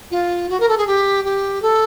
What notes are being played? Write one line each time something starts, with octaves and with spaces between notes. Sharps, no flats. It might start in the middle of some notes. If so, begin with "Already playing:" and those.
F4
F#4
A#4
A4
G#4
G4
G4
A4